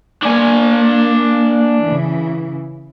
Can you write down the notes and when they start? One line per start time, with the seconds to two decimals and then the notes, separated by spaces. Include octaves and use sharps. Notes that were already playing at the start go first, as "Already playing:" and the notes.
0.23 A#3 D4 G#5
1.84 C#3 E3